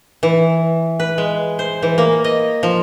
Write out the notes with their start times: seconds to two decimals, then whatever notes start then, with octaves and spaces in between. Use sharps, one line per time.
0.23 E3
1.00 B4
1.18 G#3
1.59 C5
1.83 E3
1.98 A#3
2.24 D#5
2.63 F3